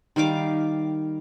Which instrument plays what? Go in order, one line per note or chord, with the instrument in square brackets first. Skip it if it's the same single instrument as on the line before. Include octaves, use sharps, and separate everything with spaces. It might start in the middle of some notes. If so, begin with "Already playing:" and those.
[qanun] D#3 G3 F5 D6